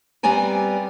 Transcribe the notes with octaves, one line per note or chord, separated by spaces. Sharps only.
G3 B3 C4 D5 G#5 A#5